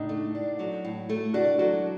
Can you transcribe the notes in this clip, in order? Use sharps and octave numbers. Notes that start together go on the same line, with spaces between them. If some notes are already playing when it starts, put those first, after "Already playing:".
Already playing: A2 D4 D#4
A3
D4
F#3
A2
A3
D4 F#4
F#3 F#4